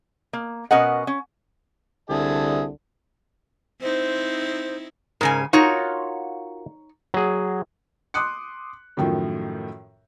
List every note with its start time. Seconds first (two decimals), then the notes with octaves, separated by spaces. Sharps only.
0.33 A#3
0.71 B2 C#4 A#4 D#5 F#5
1.07 C#4
2.10 C2 D3 G#4 E5 A5
3.81 C4 D#4 E4 C5
5.21 G#2 C#3 A#4 G#5
5.53 D#4 F4 F#4 A#4 C#5
7.14 F#3 G#4
8.14 C6 D6 D#6 F#6 C#7
8.97 F#2 A2 D#3 F3 F#3